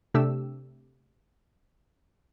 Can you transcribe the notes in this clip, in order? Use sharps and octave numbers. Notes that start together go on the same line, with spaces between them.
C3 A3 D4 G4 E6